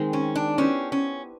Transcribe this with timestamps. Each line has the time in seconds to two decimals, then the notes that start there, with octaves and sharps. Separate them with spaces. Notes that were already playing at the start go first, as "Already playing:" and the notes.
Already playing: D#3 G#3 C4
0.13 C#4
0.35 D4
0.58 B3 C#4 E4 G4 C5
0.92 C#4